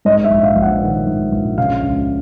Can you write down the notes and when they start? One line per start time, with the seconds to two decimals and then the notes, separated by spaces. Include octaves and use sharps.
0.05 G#2 D#5
0.24 E5
0.30 A#1
0.43 F5
0.56 A#1
0.62 F#5
0.82 D#3
1.07 G#2
1.32 A#1
1.58 C#3 F5
1.83 C#2